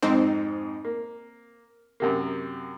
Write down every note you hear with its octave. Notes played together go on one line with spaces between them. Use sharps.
F2 G#2 C4 D#4
A#3
F#2 C3 A#3